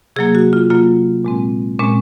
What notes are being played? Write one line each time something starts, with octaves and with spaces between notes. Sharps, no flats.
C3 F#3 A#3 G#4
F#4
F4
C3 F#3 A#3 F4
A#2 G#3 C4
A#2 G#3 C4 C#4